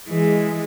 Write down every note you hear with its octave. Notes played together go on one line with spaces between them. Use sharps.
E3 G#3